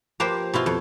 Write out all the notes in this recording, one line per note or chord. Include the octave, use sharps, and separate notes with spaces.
F3 A#3 G4 B4 C5
B2 E4 F4
F2